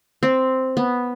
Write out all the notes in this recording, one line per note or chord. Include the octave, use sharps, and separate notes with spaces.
C4
B3